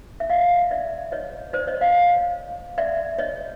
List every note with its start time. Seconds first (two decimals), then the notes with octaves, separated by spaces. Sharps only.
0.20 E5
0.30 D#5 F5
0.71 D5 E5
1.12 C#5 D#5
1.53 C5 D5
1.67 C#5 D#5
1.81 D#5 F5
2.78 D5 E5
3.18 C#5 D#5